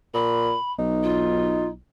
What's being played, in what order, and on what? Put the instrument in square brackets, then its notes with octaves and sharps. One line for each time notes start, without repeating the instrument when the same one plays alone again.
[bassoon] A#2 [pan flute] B5
[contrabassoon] B1 [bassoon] D#4
[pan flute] F4